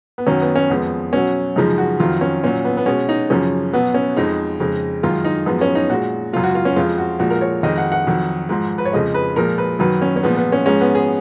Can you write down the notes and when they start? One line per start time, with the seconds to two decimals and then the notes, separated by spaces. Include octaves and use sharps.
0.18 B3
0.27 F#2 D#3 F#3 C#4
0.41 B3
0.56 C#4
0.70 F2 F3 G#3 B3
1.13 B2 F#3 C#4
1.56 F#2 C#3 F3 G#3 D#4
1.78 F#4
2.00 F2 D#3 F#3 F4
2.21 C#4
2.43 A#2 F#3 C#4
2.65 B3
2.77 B3
2.86 B2 G#3 C#4
3.09 D#4
3.30 F#2 C#3 F3 C#4
3.73 B2 F#3 B3
3.94 C#4
4.17 F2 F3 G#3 D#4
4.60 F2 C#3 G#3
5.03 F#2 D#3 G#3 F4
5.25 D#4
5.46 F#2 F3 G#3 B3
5.61 C#4
5.75 D#4
5.90 A#2 G#3 F#4
6.33 F#2 C#3 G#3 F4
6.44 F#4
6.55 F4
6.65 C#4
6.76 F2 F3 G#3 F4
6.98 F#4
7.20 A#2 F3 G#3 F#4
7.30 A#4
7.41 C#5
7.63 F2 D#3 G#3 D#5
7.78 F#5
7.92 F#5
8.07 F2 D#3 F#3
8.49 G#2 F3 G#3
8.78 B4
8.85 C#5
8.93 F2 C#3 F3 G#3 D#5
9.14 B4
9.36 A#2 F3 G#3 A#4
9.58 B4
9.79 F#2 D#3 F#3 B4
10.02 C#4
10.16 C#4
10.23 A#2 F3 G#3 B3
10.37 B3
10.52 C#4
10.66 G#2 F3 G#3 C#4
10.81 B3
10.95 G#4